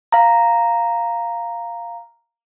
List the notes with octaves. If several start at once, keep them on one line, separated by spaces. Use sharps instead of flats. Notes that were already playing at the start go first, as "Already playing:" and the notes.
F5 A#5